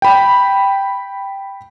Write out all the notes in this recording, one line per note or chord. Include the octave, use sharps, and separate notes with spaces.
G5 B5